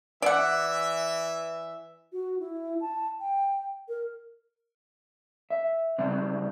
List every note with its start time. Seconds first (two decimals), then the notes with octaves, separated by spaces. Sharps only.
0.22 E3 D5 E5 F#5
2.13 F#4
2.39 E4
2.81 A5
3.21 G5
3.89 A#4
5.50 E5
5.98 C#3 G3 C4